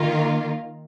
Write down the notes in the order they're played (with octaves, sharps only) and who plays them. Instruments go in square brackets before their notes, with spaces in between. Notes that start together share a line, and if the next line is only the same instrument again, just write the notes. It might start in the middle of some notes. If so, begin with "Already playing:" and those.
Already playing: [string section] D#3 A#3 F4 A#4